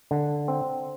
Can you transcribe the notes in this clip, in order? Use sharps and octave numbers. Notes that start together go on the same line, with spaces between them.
D3
C4